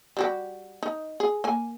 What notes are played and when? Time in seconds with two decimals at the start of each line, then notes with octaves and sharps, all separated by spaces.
0.17 G3 F#4 G4
0.83 D#4
1.20 G#4
1.44 A#3 G#5